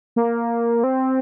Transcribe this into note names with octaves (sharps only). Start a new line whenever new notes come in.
A#3
C4